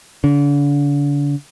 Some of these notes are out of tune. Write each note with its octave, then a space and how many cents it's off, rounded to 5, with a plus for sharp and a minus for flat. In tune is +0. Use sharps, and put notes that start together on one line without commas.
D3 -40